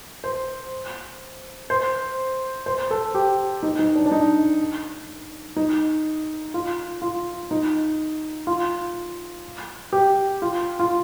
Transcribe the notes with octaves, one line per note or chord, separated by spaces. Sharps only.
C5
C5
C5
A4
G4
D#4
D#4
D4
D4
D#4
D#4
F4
F4
D#4
F4
G4
F4
F4